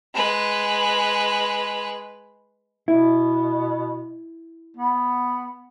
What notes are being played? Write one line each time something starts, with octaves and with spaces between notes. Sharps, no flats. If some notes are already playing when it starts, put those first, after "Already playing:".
G#3 B4
B2 E4
B3